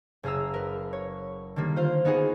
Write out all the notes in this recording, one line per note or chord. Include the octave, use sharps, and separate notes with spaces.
F#1 G#4 F5 A#5 E6
A#4 B4
C#5
D3 D#3 G3 A#3
F4 C5 F5 C6
B3 D#4 F#4 G#4